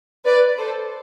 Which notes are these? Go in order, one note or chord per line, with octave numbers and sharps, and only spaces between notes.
B4 D5
A4 C5